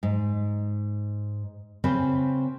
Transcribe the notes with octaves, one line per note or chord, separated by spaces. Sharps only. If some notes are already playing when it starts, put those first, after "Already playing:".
G#2
C#3 C4 B4 C5 G#5